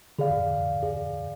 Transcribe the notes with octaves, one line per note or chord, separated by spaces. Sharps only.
D3 G#4 D5 F5
G#4 D5 F5